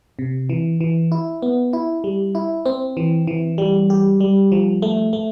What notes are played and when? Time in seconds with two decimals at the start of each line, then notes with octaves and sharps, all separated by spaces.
0.19 C3
0.49 E3
0.81 E3
1.12 E4
1.42 B3
1.73 E4
2.04 G3
2.35 E4
2.66 C4
2.97 E3
3.27 E3
3.58 G3
3.90 G4
4.21 G3
4.52 F3
4.82 A3
5.13 A3